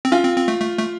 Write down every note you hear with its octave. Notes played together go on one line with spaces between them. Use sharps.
C4
C#4 F4
C4
C4
A3
A3
A3